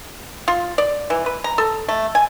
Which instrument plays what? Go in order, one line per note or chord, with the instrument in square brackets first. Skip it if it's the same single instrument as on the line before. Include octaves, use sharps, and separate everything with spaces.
[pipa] F4
D5
E3
B4
A#5
A4
A3
G#5